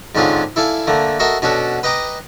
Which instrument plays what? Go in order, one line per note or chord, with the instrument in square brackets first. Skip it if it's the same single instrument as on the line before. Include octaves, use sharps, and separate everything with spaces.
[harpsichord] G#2 D3 C4 C#4 F4 G#4
E4 A4 D5 F5 G#5
D3 A3 A#3
F#4 A4 A#4 D#5 E5
B2 C#4 D4 F#4 A4
B4 D#5 G5 A#5 D6 D#6